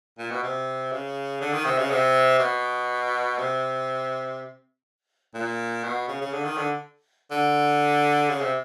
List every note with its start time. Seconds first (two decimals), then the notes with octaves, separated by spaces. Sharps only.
0.18 A#2
0.31 B2
0.43 C3
0.92 C#3
1.41 D3
1.53 D#3
1.65 C3
1.78 C#3
1.91 C3
2.39 B2
3.38 C3
5.34 A#2
5.84 B2
6.08 C#3
6.21 C#3
6.33 D3
6.45 D#3
6.57 D3
7.31 D3
8.29 C#3
8.41 C3